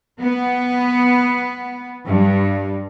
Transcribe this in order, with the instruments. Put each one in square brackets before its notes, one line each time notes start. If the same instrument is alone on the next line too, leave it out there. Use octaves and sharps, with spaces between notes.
[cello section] B3
G2